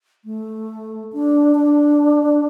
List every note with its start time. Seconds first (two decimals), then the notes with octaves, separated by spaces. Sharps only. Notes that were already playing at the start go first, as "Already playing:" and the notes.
0.25 A3
1.13 D4
1.56 D4